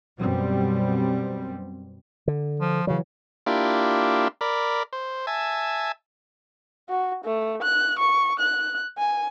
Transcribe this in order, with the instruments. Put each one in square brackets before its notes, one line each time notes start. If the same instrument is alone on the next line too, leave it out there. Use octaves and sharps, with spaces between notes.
[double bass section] F#2 B2 G3 C4
[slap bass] D3
[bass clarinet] F3
[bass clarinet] C#3 [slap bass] E3 F#3
[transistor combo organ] A#3 D4 E4 F4 G4
A#4 D5 B5
C5
E5 G#5 A5
[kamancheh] F#4
A3
F#6
C#6
F#6
G#5